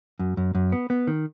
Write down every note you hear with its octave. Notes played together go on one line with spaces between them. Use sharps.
F#2
F#2
F#2
B3
B3
D#3